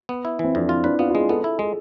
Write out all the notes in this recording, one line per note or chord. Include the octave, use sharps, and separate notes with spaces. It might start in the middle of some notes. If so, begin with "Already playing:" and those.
B3
E4
E3 C4
F2 D4
E4 F4
D4 B4
B3 F4
F4
G#3 G#4
B3 A4
E4
G#3 G#4